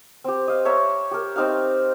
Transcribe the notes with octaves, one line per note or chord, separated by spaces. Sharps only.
C4 G4
D#5 F5
C#5 E5 A#5
G4 A#4
C4 D#4 G4 F5